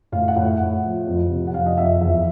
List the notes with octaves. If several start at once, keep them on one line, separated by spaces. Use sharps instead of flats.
A2 F5
F#5
A2
F#5
A2
F3
F2
C3
F#5
F2 F5
D#5
F2 E5
E2 E5